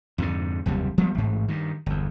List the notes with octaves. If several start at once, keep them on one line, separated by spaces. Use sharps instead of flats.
F2 G#2 B2 D3
F#1 D#2 C3 G3
F3 G3 B3
A1 G#2
G2 D#3
G1 E2